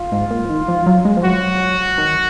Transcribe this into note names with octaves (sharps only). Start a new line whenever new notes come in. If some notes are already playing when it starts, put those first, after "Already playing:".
Already playing: F4
G#2
A#2
F3
D#3
F3
F#3
G#3
F3
F#3 F#4
D#3